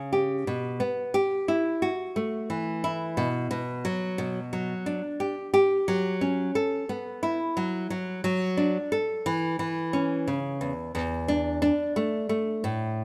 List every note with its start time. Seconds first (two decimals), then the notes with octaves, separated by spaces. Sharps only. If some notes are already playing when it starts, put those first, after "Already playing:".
Already playing: C#3
0.13 G4
0.47 B2
0.80 B3
1.14 G4
1.48 E4
1.82 F#4
2.16 A3
2.50 E3
2.84 E4
3.17 B2
3.51 B2
3.85 F#3
4.18 B2
4.53 F#3
4.86 D4
5.20 G4
5.54 G4
5.88 F#3
6.21 C#4
6.55 A4
6.89 B3
7.23 E4
7.57 F#3
7.90 F#3
8.24 F#3
8.57 D4
8.92 A4
9.26 E3
9.59 E3
9.93 C#4
10.28 C#3
10.61 E2
10.95 E2
11.28 D4
11.62 D4
11.96 A3
12.29 A3
12.64 A2